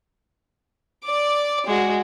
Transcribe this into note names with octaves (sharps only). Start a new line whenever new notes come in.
D5 D6
G#3 F#4